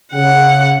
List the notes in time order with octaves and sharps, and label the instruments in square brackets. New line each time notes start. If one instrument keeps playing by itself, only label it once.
[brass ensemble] C#3 [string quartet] F#5